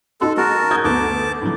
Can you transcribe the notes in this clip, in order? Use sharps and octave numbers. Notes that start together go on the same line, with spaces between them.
D#4 F#4 A4 C6
G#3 F#4 A#4 A5
D#6 G6 G#6
D2 B3 A5 D6
A2 D3 F#3